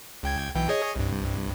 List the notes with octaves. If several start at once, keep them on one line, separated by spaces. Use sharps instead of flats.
C#2 G5 G#6
B1 E3 G5
G#4 C#5 D#5
C2 G2